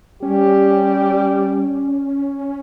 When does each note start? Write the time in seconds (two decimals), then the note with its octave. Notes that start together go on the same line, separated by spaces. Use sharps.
0.23 G3 C#4 G4